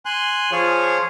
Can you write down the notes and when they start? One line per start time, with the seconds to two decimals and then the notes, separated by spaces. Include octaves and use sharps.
0.06 G#5 C6 F#6
0.52 F3 F4 G#4 C#5